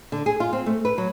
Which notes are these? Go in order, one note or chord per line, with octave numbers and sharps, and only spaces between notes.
D3
G#4
F4
C4
A3
B4
F#3